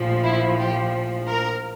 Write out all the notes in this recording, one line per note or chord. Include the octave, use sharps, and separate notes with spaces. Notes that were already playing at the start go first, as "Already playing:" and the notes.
Already playing: A#1 A2 F3
E4
G4
A#4